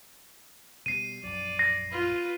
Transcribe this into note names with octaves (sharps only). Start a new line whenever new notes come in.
B2 G3 C7 D#7
A#1 F#2 F#3 D5
A#6 C7
F4 B4